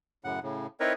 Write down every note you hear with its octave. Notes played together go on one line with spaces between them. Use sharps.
F#2 A2 C#3 F#5
A2 C#3
C4 D#4 E4 A#4 B4 C#5